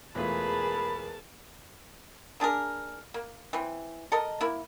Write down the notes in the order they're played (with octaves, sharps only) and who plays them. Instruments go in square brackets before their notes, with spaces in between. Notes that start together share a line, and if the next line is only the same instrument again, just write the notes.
[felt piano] E1 A3 F4 [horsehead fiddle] G#4 B4 [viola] A#4 A5 [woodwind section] B5
[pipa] A#3 D4 G#4 A#4
A#3
E3 C4
A4 A#4 D#5
A#3 E4